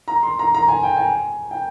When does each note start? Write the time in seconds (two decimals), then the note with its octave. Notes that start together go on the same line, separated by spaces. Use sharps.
0.08 A#5
0.23 C6
0.39 A#5
0.54 A#5
0.68 G#5
0.83 G5
0.97 G#5
1.51 G5